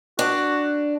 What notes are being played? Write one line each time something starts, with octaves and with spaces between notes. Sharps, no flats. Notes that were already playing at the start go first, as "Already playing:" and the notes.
D4 F#4